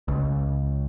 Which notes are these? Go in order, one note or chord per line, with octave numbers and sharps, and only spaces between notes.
C#2